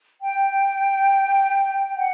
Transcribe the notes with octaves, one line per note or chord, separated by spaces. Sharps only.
G5
F#5